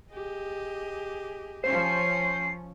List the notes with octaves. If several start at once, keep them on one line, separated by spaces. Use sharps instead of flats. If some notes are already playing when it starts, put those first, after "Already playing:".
G4 G#4 D#5
F3 C#4 C5 C7